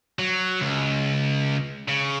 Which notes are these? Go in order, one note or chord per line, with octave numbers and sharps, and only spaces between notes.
F#3
C#2
C#3